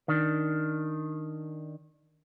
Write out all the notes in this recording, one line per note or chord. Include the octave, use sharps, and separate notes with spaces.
D#3 D4